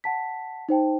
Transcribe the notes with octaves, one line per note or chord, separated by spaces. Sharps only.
F#5 A5 B6
D#4 C5 G5 A5